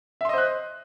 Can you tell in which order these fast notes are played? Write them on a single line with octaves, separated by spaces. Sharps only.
E5 C6 D#5 C5 F#6